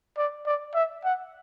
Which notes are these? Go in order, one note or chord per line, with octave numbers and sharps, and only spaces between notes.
D5
D5
E5
F#5